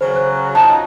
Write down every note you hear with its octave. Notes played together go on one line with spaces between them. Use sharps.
C#3 F#3 C5
F#6
F3 F#3 D#4 A5